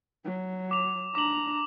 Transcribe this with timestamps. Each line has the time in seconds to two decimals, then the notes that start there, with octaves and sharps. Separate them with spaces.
0.24 F#3
0.71 D6 F7
1.15 D4 A#5 D6 F#7